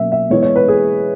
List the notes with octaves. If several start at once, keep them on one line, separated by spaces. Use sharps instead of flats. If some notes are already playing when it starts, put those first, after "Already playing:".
Already playing: B2 F#3 A#3 C#4 E5
E5
E3 G#3 B3 E4 C#5
C#5
B4
G#4